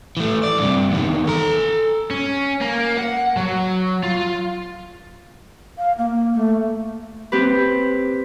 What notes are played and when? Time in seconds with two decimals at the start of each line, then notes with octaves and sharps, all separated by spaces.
0.17 E3 A3
0.43 D5
0.58 G2 C3
0.91 E2 D#3
1.27 A4 A#5
2.11 C#4
2.61 A#3
2.97 F#5
3.37 F#3
4.03 F4
5.78 F5
5.98 A#3
6.33 A3
7.32 C4 G4 B4